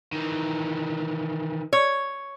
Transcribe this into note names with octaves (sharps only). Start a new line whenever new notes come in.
D#3 E3
C#5